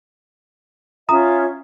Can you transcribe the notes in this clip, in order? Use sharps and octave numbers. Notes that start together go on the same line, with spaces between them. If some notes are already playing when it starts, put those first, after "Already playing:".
C#4 F4 E5 A#5 D#6